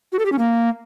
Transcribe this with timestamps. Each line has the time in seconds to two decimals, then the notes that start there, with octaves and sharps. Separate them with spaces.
0.13 F#4
0.19 A4
0.26 G4
0.32 C#4
0.39 A#3